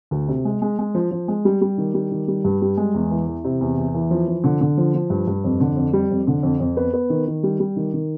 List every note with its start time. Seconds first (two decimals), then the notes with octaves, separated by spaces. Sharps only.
0.11 D2
0.28 C3
0.45 G#3
0.62 G#3
0.79 G#3
0.95 F3
1.11 F3
1.28 G#3
1.45 G3
1.61 G3
1.78 D#3
1.94 G3
2.11 D#3
2.28 G3
2.44 G2
2.62 G3
2.77 G#3
2.94 E2
3.11 E3
3.27 E3
3.44 C3
3.61 E2
3.77 E2
3.95 E3
4.11 F3
4.28 F3
4.44 D3
4.61 D3
4.78 F3
4.94 F3
5.10 G2
5.27 G2
5.44 F2
5.60 D3
5.76 F2
5.93 G3
6.10 F2
6.27 D3
6.43 F2
6.60 F2
6.77 B3
6.93 B3
7.10 D#3
7.27 D#3
7.43 G3
7.60 G3
7.76 D#3
7.93 D#3